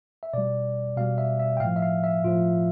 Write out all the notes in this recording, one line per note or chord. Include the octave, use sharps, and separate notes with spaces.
E5
B2 G3 D5
B2 G3 F5
E5
E5
G5
A2 F3 F5
E5
F5
E5
A2 F3 F4